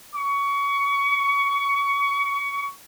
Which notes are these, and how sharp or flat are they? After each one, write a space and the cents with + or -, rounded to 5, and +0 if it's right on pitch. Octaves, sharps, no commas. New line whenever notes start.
C#6 +25